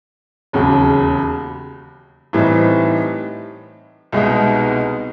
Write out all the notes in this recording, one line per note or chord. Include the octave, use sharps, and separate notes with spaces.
E1 D#2 C#3 F#3
A2 E3 G3 C4 D#4
C2 B2 G#3 B3 D#4